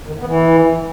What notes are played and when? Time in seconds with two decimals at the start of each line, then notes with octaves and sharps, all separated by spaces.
0.08 D#3
0.14 A2
0.20 B3
0.26 E3